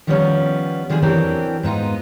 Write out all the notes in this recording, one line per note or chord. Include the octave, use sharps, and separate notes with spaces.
D#3 F3 G3 A#3 B3 C#4
D3 D#3 F3 D4 G#4
E3 F#3 C4 D4 G4 A#4
G#2 B3 D#4 F4